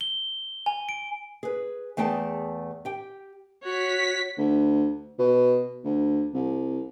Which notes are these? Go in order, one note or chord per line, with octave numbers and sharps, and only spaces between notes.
G7
G#5
D7
G#4 B4
E2 A3 G#4 G5 A5
G4 G5
F#4 C#5 B6
D2
B2
D2
C2